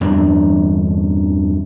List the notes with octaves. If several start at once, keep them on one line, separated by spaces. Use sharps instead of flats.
E2 G2 E3 D4